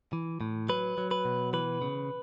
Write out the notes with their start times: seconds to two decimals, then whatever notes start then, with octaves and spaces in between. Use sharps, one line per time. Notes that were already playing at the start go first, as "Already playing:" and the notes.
0.13 E3
0.41 A2
0.69 F#3 B4
0.98 F#3
1.11 B4
1.25 B2
1.53 E3 B4
1.82 C#3